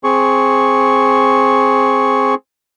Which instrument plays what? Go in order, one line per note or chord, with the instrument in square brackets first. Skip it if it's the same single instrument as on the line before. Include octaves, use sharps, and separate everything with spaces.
[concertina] C4 G#4 C#6